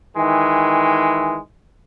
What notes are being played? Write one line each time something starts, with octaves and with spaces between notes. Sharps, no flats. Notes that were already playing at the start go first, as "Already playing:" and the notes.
D#3 E3 G#3